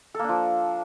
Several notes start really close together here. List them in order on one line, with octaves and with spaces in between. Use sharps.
A4 A#3 D4 F3